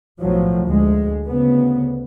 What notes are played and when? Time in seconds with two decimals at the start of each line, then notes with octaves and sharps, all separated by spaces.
0.20 B1 A2 F3 F#3
0.63 D2 G#3
1.27 D2 C#3 B3